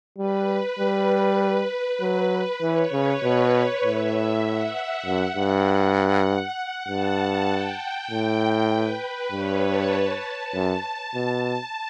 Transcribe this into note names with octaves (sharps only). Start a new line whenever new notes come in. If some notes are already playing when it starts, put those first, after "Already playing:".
G3 B4
G3
F#3
E3 C#5
C#3 B4
B2 C#5
A2 E5
F#5
F#2 F#5
G2
G2 A5
A5
G5
A2
B4
G2 C#5
A5
F#2 A5
B2